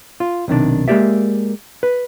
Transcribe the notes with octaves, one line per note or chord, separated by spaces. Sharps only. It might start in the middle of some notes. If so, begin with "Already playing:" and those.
F4
B1 C3 D#3 D4
G#3 A#3 C4 G4 D5 E5
B4